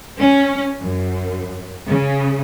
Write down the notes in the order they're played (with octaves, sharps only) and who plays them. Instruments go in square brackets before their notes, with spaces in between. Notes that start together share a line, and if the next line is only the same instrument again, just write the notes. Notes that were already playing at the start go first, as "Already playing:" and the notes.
[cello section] C#4
F#2
C#3